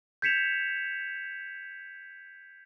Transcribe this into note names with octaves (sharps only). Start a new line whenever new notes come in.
G6 G#6 B6 C#7 E7 F7